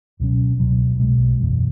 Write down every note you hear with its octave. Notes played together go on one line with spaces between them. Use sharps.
C#2 B2 F#3 C#4
C#2 B2 F#3
B1 B2 G#3
F#1 E2 B2